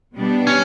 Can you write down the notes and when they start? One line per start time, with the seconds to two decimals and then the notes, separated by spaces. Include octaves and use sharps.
0.15 B2 G3 B3 D4 G4
0.47 C#4